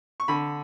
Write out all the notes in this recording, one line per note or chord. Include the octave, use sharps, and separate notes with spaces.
C#6
D3 B5